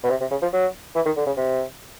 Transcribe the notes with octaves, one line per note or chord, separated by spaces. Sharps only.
B2
C3
C3
C#3
F3
F#3
E3
D#3
D3
C#3
C3